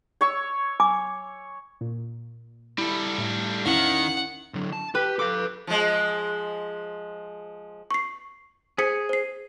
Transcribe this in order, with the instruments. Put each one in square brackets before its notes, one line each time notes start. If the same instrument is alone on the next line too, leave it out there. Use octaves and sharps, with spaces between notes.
[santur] C#5 C#6 E6
[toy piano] G#5 D6
[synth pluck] A#2
[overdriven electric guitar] G3 A4 [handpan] E4 [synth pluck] B5
[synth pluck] A2 A3
[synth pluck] E2 [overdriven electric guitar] D#3 [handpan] C#4 E4 F5 [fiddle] F#5
[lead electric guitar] D3 F#3
A5
[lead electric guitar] G4 G5 [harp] B4
[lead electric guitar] A4 F5 [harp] D6
[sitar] F3 G#3
[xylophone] C#6 C7
[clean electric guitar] G#4 [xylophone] C5 B6 C#7
[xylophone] C5 C7